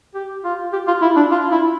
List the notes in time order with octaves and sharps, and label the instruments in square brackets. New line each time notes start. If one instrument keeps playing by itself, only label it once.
[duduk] G4
F4
G4
F4
E4
D4
F4
E4